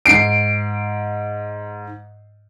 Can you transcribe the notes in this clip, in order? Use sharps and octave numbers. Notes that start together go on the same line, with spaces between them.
G#2 C7 D7